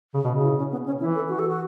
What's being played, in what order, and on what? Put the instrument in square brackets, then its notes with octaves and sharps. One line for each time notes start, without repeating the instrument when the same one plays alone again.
[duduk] C#3
B2
C#3
[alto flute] C#4
E4
C#4
B3
C#4
[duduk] E3 [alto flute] E4
[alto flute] A4
F#4
A4
F#4